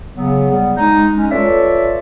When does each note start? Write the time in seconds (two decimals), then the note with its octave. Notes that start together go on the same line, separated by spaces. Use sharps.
0.16 C#3 F#3 B3
0.51 G3 B3
0.77 G#3 D#4
1.16 G#3 C#4
1.31 F4 A4 B4 C#5 D5 E5